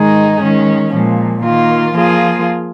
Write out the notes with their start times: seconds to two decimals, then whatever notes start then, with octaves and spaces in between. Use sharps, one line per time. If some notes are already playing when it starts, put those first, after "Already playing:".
Already playing: G#2 D#3 G#3 D#4 G#4
0.43 D#3 G#3 C#4
0.93 A#2 F3 G#3
1.43 D#3 A#3 F4
1.94 F3 A#3 F4 G#4